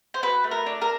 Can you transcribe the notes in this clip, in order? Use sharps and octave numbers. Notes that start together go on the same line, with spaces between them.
C5
F#4 B4
A3
A#4
D4
A#4